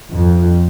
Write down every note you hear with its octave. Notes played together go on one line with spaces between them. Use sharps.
F2